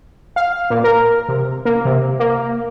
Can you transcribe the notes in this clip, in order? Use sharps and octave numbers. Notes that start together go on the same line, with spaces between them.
F5
A#2
A#4
C3
A#3
C3
A#3